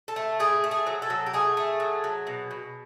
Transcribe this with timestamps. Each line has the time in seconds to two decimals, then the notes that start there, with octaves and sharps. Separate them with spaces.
0.08 A4
0.16 A3
0.40 A2 G#4
0.64 A3
0.71 G#4
0.87 F#3
1.02 A4
1.10 F#3
1.26 G4
1.33 A3 G#4
1.57 A3
1.80 F#3
2.04 F#3
2.27 B2
2.51 B2